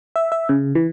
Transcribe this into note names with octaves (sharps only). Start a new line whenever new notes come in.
E5
E5
C#3
E3